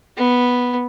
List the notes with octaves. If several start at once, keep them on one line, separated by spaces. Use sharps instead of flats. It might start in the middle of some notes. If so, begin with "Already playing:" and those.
B3